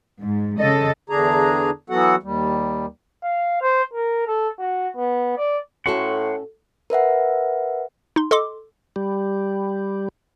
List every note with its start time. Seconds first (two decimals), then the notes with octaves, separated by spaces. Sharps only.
0.20 G#2
0.58 C#3 A4 D#5
1.10 E2 D3 D4 G#4 A#5
1.90 E3 F#3 B3 F#4 A4 F#5
2.23 D#2 G3
3.23 F5
3.61 C5
3.93 A#4
4.27 A4
4.59 F#4
4.96 B3
5.37 D5
5.86 A2 C#4 F#4 A4 F#5 C6 C#6
6.90 A#4 B4 E5 F#5
8.16 D#4 C6
8.31 A4 D#5 C6 D6
8.96 G3